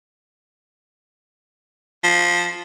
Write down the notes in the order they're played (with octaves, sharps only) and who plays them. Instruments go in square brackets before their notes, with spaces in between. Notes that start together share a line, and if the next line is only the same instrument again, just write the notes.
[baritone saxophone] F3